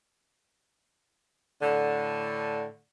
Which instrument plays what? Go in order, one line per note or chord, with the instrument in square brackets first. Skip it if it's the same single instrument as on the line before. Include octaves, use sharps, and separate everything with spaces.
[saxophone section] A2 D3